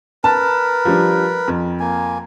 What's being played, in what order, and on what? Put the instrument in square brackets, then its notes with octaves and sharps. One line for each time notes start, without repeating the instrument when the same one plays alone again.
[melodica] A#4 B4 [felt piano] A5
[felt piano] F3 G3 D4
F2
[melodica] A#3 G#5